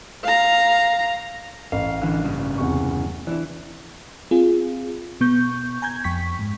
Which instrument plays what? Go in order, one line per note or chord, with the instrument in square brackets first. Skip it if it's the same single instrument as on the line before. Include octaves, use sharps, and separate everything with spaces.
[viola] F5 A#5
[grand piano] A1 [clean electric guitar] F5
[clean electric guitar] D3 E3
G2 C#3
[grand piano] E2 C3 C#6
[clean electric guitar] E3 [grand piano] D4 E4
[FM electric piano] C4 F4 G#4
B2 B3 C#6 G6
G#5 A#5 G6 G#6
F2 G5 C#6 B6
G#2